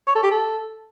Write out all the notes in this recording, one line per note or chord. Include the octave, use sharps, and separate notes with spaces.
C#5
A4
G4
A4